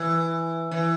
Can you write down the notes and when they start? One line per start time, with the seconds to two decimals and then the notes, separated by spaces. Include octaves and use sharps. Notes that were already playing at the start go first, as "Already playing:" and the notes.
Already playing: E3
0.71 E3